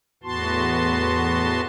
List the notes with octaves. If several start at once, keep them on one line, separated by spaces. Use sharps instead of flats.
E2 A2 B3 F#4 A5 C6